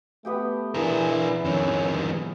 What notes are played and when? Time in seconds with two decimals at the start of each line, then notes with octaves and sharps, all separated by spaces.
0.25 A3 B3 G4 G5
0.74 E3 D4 G#4 A#4
1.11 E4
1.45 F2 D#3 C#4
1.90 G1